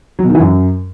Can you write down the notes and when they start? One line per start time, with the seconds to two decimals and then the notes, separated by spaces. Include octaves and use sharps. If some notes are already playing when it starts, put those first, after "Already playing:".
0.19 F#3
0.24 B2
0.29 D#3
0.35 E3
0.40 F#2